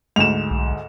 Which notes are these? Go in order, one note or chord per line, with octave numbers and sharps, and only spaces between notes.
D2 G#2 E7 F7
B1